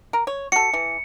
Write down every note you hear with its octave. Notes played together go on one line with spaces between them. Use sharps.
A#4
C#5
F#4 A4 C#7
E3